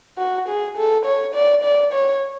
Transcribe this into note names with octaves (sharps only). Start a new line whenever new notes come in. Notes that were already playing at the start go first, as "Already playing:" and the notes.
F#4
G#4
A4
C#5
D5
D5
C#5